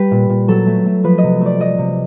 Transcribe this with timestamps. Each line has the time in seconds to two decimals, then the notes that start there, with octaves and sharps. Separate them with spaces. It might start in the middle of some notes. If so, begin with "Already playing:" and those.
Already playing: G3 G4 B4
0.11 A#2
0.29 A#2
0.48 F#3 A4
0.66 A3
0.85 A3
1.04 F3 B4
1.18 D#5
1.23 C3
1.41 A3 D5
1.59 A3 D#5
1.78 C3